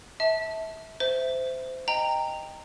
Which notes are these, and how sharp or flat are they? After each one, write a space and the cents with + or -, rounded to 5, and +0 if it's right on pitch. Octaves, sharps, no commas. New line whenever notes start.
E5 -30 A5 +0
C5 -20 E5 +0
D#5 -10 G5 +10 A#5 -15